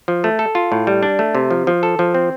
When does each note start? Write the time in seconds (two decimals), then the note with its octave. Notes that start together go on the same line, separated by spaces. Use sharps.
0.08 F3
0.24 A3
0.39 A4
0.55 F4
0.72 A2
0.87 G3
1.03 D4
1.19 A3
1.35 C3
1.51 F3
1.67 F3
1.83 A4
1.99 F3
2.14 C4